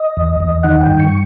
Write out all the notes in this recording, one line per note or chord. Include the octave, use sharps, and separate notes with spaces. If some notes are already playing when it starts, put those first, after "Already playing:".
Already playing: D#5
E2
E2
D#3 F#5
G5
G2
C#6